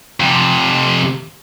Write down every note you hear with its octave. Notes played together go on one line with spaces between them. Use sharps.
F2 C3